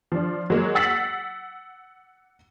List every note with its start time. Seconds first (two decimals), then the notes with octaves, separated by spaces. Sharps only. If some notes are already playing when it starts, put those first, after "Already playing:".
0.12 F3 D4
0.50 F#3 G#3 A#3
0.75 F#5 E6 A6 B6 C7 F#7